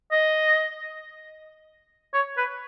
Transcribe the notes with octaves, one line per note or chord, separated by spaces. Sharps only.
D#5
C#5
B4